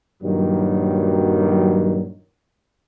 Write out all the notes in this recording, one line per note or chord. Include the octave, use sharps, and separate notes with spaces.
G2 A#2 D#3 F#3